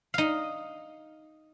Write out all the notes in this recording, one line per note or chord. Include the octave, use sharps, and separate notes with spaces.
D#4 F5